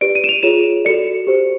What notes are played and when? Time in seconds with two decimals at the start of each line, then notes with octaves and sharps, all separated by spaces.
0.01 G4 B4 D5 D7
0.15 D#7
0.24 E7
0.29 F7
0.43 F4 G#4 C#5 E7
0.85 F#4 A4 D5 C#7
1.27 G4 C5